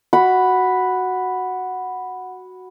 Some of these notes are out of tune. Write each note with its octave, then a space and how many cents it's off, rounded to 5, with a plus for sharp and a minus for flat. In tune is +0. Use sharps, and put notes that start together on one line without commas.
F#4 +0 F#5 +0 B5 +0